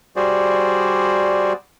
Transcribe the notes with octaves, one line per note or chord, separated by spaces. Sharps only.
G3 F#4 G#4 C5 D5